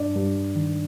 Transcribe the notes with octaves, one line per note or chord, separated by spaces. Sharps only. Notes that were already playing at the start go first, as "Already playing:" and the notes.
Already playing: G2 D4 D5
G2
D#3